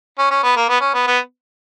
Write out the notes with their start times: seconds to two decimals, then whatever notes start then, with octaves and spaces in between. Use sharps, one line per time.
0.18 C#4
0.30 C#4
0.43 B3
0.56 A#3
0.69 B3
0.81 C#4
0.94 B3
1.07 B3